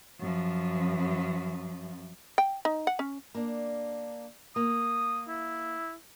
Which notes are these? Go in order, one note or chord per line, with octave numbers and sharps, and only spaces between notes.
F#2 F3
G5
D#4
F#5
C#4
A#3 D4
A#3 D#6
E4